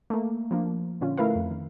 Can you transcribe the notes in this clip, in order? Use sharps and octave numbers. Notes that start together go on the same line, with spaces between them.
A3 A#3
F3 A#3 D4
A#2 D3 C#4 F4
A3 E4 A#4 B4 F5
F2
D#3